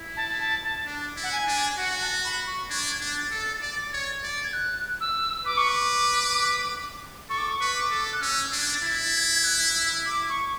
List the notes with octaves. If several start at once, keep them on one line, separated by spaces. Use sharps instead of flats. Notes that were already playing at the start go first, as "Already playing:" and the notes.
Already playing: E4
A5
A5
A5
D4
E4
F#5
G#5
D4
F#4 F#5
A5
B5
C#6
D4 G#6
D4
A6
A4
D5
C#5
D5
G#6
F#6
E6
B4 D6
C#6
D6
A4 C#6
D6
C#6
B4
D6
A4
F#6
C#4 E6
D4
G#6
A6
E4
G#6
G#6
F#6
E6
D6
C#6